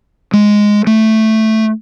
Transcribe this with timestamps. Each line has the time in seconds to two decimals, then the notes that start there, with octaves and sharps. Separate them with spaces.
0.33 G#3
0.87 A3